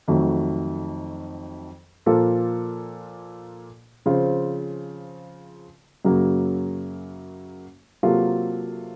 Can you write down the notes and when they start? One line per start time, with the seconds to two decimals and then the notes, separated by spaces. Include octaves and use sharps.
0.08 F2 D#3 F#3 A3
2.06 A#2 F3 A#3 F4 A4
4.06 C#3 F3 C4 F4
6.05 F#2 C#3 F#3 A#3
8.03 C3 F#3 A#3 F4 A4